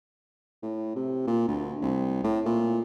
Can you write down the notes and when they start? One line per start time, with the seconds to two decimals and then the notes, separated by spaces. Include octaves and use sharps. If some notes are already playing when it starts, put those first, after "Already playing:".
0.63 A2
0.95 C3
1.27 A#2
1.48 D2
1.82 C2
2.23 A2
2.46 A#2